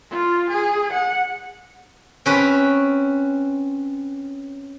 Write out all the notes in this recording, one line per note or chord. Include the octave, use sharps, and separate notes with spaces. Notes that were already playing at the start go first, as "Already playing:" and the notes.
F4
G#4
F#5
C4 C#4 B4